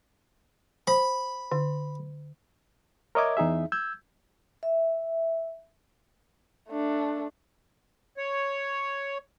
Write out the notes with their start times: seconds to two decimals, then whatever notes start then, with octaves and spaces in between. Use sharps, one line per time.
0.87 C5 B5
1.52 D3
3.15 A#4 C#5 D#5 E5 D6 G#6
3.37 E2 D#4 G#4 E5
3.72 E6 G6 G#6
4.63 E5
6.69 A3 D4
8.17 C#5